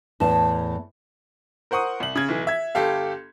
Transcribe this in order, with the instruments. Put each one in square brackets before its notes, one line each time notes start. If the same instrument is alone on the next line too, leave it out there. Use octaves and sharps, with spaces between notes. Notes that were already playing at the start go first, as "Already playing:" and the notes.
[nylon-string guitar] E2 A2 A5
[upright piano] A#4 C5 F#5 C#6 D#6
C2 F#7
C#3 G#6
B1 E3
E5 G#6
G1 G4 A4 F5